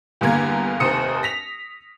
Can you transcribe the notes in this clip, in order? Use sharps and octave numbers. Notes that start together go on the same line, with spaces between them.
E2 G2 D3 A#3 A#5 G#6
F1 D#2 C5 A#5 D#6 C#7
A#6 B6 F7